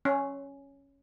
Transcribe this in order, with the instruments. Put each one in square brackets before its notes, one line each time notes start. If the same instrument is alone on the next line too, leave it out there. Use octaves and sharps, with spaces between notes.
[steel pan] C#4